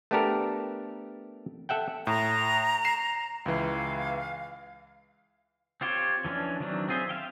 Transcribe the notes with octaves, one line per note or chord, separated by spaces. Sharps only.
A3 B3 D4 G4 A4 A#4
A4 E5 F#5 G5
A2 A#5
C7 E7
C#2 E3 F5
C4 F4 G4 C5 C#5
E3 F3 C#4 D4
D#3 E3 F#3 C4 D4
C4 F4 G#4 C5 E5
E5 F5 G5